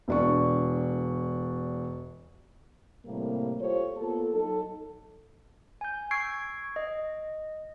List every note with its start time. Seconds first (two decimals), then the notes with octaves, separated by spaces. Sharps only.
0.08 E1 D4 C#6
3.06 A2 C3 G3 A#3
3.60 F4 G4 A4 C5 C#5
3.96 A#3 B3 F4 A4
4.34 F#3 D#4 A4
5.81 G#5 G6
6.11 C#6 E6 G#6 C7 D7
6.76 D#5